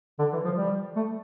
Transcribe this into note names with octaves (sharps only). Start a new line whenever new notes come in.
D3
E3
F3
G3
A3